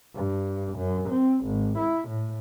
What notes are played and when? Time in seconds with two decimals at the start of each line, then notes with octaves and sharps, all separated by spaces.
0.15 G2
0.77 F#2
1.09 C4
1.45 G#1
1.79 E4
2.09 A2